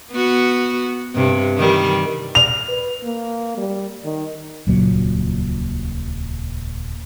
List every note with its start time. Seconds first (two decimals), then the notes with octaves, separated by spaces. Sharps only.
0.11 B3 F#4
1.15 G2 C3
1.58 D#3 E3 G3
2.35 F7
2.69 B4
3.04 A#3
3.57 G3
4.05 D#3
4.67 D#1 C#2 A#2 F#3